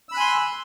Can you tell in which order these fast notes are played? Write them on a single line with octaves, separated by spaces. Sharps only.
E6 B5 F#6 G#5 C6